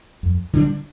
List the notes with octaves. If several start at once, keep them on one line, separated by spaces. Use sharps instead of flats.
F2
D3 G3 D4